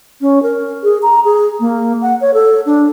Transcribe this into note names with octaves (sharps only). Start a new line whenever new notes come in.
C#4
A#4
G#4
A#5
G#4
A#3
F#5
C#5
A4
D4